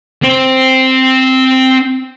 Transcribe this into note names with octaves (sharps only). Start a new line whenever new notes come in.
C4 C5